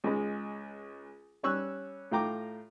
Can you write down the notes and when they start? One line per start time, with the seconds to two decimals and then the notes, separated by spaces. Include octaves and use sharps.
0.04 C#2 G#3
1.43 G3 C#4 C#6 E6 F#6
2.11 A2 F4 G5 A#5 D6